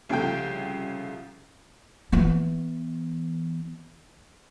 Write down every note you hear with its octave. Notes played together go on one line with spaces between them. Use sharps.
C2 C#3 F3 A3 G5 G6
E3 B3